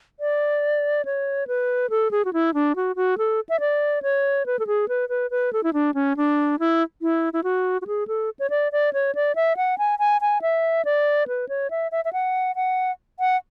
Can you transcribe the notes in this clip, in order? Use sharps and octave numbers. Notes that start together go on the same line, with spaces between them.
D5
C#5
B4
A4
G#4
F#4
E4
D4
F#4
F#4
A4
E5
D5
C#5
B4
A4
G#4
B4
B4
B4
A4
E4
D4
C#4
D4
E4
E4
E4
F#4
F#4
G#4
A4
C#5
D5
D5
C#5
D5
E5
F#5
G#5
G#5
G#5
E5
D5
B4
C#5
E5
E5
E5
F#5
F#5
F#5